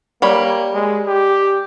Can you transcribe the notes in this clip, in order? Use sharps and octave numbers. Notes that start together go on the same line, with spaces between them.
G3 A#3 C#5 B5
G#3
G4